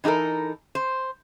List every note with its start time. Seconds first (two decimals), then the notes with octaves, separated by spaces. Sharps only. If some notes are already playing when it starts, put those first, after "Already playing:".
0.04 E3 D#4 G4 A4 A#4
0.75 C5